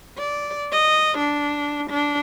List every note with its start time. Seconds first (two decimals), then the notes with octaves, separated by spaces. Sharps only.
0.18 D5
0.72 D#5
1.18 D4
1.90 D4